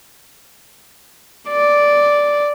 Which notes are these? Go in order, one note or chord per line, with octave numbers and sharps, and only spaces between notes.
D5